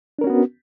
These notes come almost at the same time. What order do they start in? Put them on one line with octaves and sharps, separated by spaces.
D4 A#4 C#4 F#4 B3